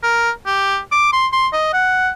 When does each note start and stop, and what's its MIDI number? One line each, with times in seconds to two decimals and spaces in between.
0.03 0.31 70
0.46 0.79 67
0.92 1.10 86
1.13 1.27 84
1.32 1.48 84
1.53 1.70 75
1.73 2.10 78